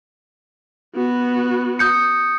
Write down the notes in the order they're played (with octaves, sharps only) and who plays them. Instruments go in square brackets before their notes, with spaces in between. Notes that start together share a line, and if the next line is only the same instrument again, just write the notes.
[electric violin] B3 F#4
[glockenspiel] D#6 G6 C#7